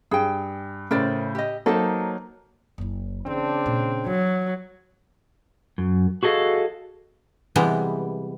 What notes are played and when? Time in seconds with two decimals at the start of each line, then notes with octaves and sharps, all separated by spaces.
0.11 G2 G#4 G5
0.91 A2 C#3 A#4 C5 D5
1.35 G4 D#5
1.66 F#3 A#3 D#4 A4 C5
2.78 F#1 E4
3.26 C#3 E3 C4 D4
3.66 A#2
4.06 E3 F#3
5.78 F#2
6.23 F#4 G#4 A4 D#5 F5
7.56 C3 E3 G3 G#3 B3